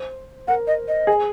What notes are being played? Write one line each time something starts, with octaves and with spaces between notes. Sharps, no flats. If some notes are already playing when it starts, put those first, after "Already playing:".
Already playing: C5
A#4 F#5
D#5
D#5
G#4